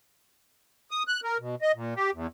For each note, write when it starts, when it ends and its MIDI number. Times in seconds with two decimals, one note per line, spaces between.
0.91 1.03 87
1.08 1.20 90
1.24 1.38 70
1.39 1.55 47
1.62 1.72 75
1.75 1.94 46
1.96 2.11 67
2.14 2.27 40